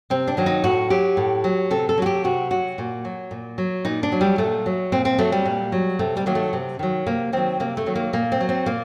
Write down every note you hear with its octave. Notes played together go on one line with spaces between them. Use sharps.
C3 C4
D4
D#3 F#3
D#4
A2 F#4
F#3 G4
A2
F#3
C3 A4
A4
F#3 F#4
G4
C3 F#4
F#3 F#4
A#2
F#3
A#2
F#3
A#2 D#4
D4
F#3
G3
A#2 A3
F#3
A#2 C4
C4
F#3 A3
G3
A#2
F#3
C3 A3
G3
D#3 F#3 A#3
A3
C3
D#3 F#3
C3 A#3
D#3 F#3 C4
C3 A#3
A3
D#3 F#3
A#3
A#2 A#3
C4
F#3
C4
A#2 A#3